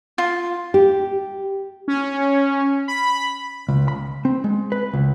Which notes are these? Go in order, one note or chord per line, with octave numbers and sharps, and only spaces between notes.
F4
G4
C#4
B5
C#2
B5
C4
G#3
B4
C#2